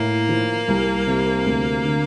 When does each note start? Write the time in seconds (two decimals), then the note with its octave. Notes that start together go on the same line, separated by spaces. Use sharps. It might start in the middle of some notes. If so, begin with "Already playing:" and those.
Already playing: A2 A#3
0.29 F3
0.68 C2
1.07 C3
1.46 D2
1.85 D3